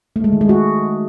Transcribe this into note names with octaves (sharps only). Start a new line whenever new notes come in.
A3
G#3
D#3
G#3
F#4